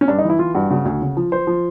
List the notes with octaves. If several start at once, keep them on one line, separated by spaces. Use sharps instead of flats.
C#4
G2 D4
D#4
E3
E4
E3 F4
G2 F#4
C#3 F#4
D2
C#3
F3
F3 C5
F3